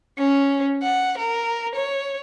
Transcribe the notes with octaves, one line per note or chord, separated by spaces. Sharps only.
C#4
F#5
A#4
C#5